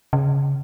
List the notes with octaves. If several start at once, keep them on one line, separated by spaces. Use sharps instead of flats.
C#3